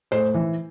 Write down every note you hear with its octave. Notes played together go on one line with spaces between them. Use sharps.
A2 C5
E3